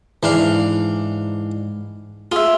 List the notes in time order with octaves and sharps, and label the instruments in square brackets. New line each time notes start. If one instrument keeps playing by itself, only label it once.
[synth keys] G#2 [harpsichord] E3 D4 F5
[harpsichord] F4 [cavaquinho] G#4 E5